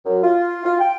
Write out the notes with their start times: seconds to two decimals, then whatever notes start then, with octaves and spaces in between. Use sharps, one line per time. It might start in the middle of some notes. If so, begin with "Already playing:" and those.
0.06 F#2
0.22 F4
0.64 F4
0.79 G5